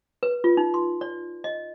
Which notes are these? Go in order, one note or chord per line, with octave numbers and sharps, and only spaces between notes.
B4
F4
D#4
C6
D5
D#5